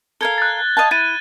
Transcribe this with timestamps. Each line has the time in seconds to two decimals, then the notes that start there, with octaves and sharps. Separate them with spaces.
0.21 A4 A#4 F5 G#6 G7
0.38 F#6 A6
0.77 D#5 F5 A5
0.91 E4 G#6 A6 D#7